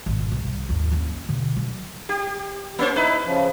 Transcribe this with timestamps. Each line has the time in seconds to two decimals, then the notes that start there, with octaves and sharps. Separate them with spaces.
0.06 G#1 B2
0.31 C2
0.69 G#1 D#2
0.91 A#3 C#4
1.29 B2 D3
1.57 F#3
2.09 G4
2.79 A#3 C#4 C5
2.96 D#4 E4 B4
3.25 C#3 F3